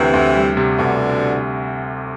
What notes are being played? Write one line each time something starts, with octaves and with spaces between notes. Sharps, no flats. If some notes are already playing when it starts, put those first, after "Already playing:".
Already playing: D2 C3 E3
D2
G3
C3
D2 B2 D3